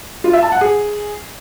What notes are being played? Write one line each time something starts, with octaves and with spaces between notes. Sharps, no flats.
F4
E5
A5
F#5
G#4